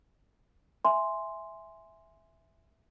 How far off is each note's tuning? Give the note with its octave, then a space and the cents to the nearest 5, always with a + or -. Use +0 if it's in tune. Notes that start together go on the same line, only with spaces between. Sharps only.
E5 +0 G#5 +0 C6 +0